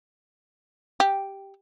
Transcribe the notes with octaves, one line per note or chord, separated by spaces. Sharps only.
G4